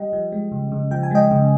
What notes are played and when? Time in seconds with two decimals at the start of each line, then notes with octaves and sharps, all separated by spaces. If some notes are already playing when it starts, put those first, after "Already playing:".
Already playing: G3 D#5 G5
0.13 F3
0.32 G#3
0.52 C#3
0.72 C#3
0.91 F3 G5
1.03 G#5
1.11 G#3 D#5 G5
1.31 C#3